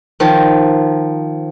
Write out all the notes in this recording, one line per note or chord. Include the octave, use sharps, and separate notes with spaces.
D#3 F3